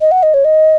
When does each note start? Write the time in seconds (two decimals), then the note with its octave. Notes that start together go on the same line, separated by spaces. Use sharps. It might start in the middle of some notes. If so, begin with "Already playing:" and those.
0.01 D#5
0.11 F#5
0.23 D#5
0.34 C#5
0.45 D#5